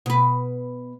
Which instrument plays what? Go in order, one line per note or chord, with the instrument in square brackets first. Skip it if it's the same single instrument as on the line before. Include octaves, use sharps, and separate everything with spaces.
[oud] B2 B4